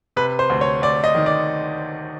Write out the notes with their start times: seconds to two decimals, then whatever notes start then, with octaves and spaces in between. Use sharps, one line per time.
0.16 C3 B4
0.39 C5
0.50 D2
0.61 C#5
0.82 D2 D5
1.04 D#5
1.15 D#3
1.26 D5